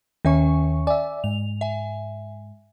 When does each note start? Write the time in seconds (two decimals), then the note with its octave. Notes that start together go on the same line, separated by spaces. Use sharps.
0.25 D#2 D#3 C#4 E5 G#5 C#6
0.87 D5 E5 G#5
1.24 G#2 F7
1.61 E5 G#5